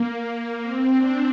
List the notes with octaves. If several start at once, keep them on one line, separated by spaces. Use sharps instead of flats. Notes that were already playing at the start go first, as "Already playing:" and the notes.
Already playing: A#3
C4
D4